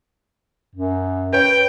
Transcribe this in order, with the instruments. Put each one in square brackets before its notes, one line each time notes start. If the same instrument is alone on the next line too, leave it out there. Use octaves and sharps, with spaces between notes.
[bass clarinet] F#2
[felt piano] B4 C#5 [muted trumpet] G5